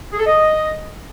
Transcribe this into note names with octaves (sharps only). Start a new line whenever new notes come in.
G#4
A4
D#5